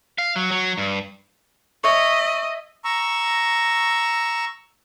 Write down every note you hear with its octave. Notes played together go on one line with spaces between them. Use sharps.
F5
F#3
F#3
G2
C#5 D#5 E5
A#5 C#6 E6